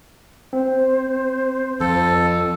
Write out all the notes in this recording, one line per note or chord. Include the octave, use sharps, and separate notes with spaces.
C4 C5
F2 A4